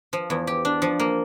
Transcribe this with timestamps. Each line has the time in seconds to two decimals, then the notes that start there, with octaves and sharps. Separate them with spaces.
0.13 F3
0.30 E2
0.47 G4
0.65 D4
0.82 F3
0.99 A#3